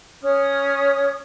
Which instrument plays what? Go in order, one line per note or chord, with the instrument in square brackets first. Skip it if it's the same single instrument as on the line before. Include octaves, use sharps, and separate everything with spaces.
[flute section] C#4 C#5 D#6 F6